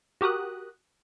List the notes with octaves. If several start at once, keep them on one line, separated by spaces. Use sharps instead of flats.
F#4 G4 A#4 D#6 F#6